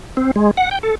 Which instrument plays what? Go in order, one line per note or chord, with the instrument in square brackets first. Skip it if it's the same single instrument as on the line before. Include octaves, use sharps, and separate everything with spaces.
[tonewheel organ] C4
G#3
F#5
G5
A4